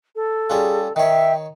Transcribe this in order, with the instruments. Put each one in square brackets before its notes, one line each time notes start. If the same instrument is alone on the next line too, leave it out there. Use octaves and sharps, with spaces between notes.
[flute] A4
[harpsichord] G3 C#4 F4 [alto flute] G#4
[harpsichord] D#3 C#5 [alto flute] E5 [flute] G5